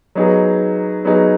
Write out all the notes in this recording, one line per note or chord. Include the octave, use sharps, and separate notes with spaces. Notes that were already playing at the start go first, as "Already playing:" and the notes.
F#3 B3 D#4 G#4
F#3 B3 D#4 G#4